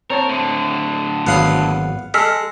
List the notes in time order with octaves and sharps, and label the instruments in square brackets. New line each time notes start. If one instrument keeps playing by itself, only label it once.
[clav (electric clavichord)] C4 C#5 A5 [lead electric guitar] A#4
[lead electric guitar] A2 D3
[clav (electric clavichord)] G#1 F#3 F#5 [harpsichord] B3 F5 D#6
[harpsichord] G#3 [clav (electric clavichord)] A4 [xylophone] E6 F6 B6